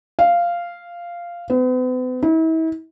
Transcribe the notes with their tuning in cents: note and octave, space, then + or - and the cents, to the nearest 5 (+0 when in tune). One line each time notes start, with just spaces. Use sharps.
F5 -10
B3 +45
E4 -40